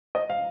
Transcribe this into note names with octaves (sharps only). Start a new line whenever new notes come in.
D#5
F5